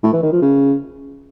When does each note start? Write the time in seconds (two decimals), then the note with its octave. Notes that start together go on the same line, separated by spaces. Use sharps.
0.03 A2
0.13 E3
0.23 D#3
0.32 F3
0.42 C#3